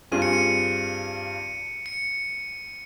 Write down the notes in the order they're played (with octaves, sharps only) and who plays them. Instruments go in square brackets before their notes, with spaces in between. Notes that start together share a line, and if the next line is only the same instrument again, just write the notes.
[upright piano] G2 G3 C4 F4 G#4 [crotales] D#7
[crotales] C#7
D#7
C#7